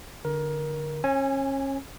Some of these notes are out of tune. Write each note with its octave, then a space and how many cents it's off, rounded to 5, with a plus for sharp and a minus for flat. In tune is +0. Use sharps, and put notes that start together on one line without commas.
D3 +5 A#4 +20
C#4 -30 G#5 +0